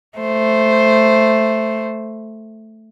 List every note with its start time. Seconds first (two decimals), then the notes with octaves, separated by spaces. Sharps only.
0.18 A3 C5